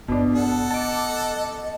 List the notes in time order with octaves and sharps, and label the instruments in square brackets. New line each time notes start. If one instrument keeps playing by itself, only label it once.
[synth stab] G1 D4 [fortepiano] B2
[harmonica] A4 F#5
[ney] D#5 [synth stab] A5 D6